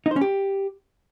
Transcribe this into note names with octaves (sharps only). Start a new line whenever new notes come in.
D#4
C5
C#4
G4